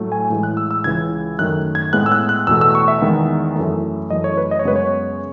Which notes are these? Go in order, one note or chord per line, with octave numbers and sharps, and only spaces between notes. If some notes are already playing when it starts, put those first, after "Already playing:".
Already playing: A2 F#3 A3
G#5
A2 E3 G#3
F#6
E6
E6
C#2 C#3 E3 G#6
F#2 D#3 A3 F#6
G#6
A2 G#3 B3 F#6
E6
F#6
F#6
E2 B2 A3 E6
E6
C#6
E5
E2 D#3 G#3 B3
F#2 E3 A3
F#2 E3 A3 D#5
C#5
B4
D#5
C#5
F#2 C#3 G#3 B3 B4
C#5